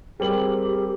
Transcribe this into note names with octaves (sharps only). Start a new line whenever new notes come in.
G3 C4 G4 G#4 A#4 F#7